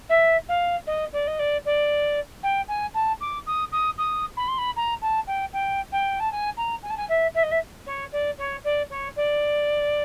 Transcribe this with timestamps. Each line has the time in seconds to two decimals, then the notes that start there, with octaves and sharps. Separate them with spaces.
0.09 E5
0.49 F5
0.87 D#5
1.13 D5
1.27 D#5
1.39 D5
1.65 D5
2.43 G5
2.68 G#5
2.94 A5
3.21 D6
3.46 D#6
3.72 D#6
3.98 D#6
4.37 B5
4.48 C6
4.58 B5
4.76 A#5
5.02 A5
5.27 G5
5.53 G5
5.92 G5
6.20 A5
6.32 G#5
6.57 A#5
6.83 G#5
6.90 A5
6.97 G#5
7.09 E5
7.34 E5
7.43 D#5
7.51 E5
7.86 C#5
8.12 D5
8.38 C#5
8.64 D5
8.90 C#5
9.16 D5